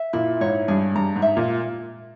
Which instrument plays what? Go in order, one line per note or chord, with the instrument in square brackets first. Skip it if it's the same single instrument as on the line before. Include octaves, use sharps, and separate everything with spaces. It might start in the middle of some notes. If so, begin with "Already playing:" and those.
Already playing: [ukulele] E5
[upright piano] A#2 [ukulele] E4
[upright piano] G#2 [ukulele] C#5
[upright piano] G2 [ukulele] G#4
[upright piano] G2 [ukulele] A#5
[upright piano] G#2
[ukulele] E5
[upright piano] A#2